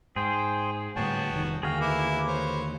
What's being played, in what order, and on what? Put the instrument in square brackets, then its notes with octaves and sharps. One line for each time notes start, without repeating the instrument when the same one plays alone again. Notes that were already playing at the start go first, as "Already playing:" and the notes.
[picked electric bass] G#2 [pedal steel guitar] G#4 [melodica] C5 G5
[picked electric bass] D2 A2 G3 [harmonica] B3 F#4 [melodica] C#5 G5 A5
[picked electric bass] F1 A#2 D#3
[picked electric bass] D#2 D3 [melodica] F#4 [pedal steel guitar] G#4 A#4 F5 [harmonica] G5
[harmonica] E4 D6 [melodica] B4
[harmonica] C5 C#5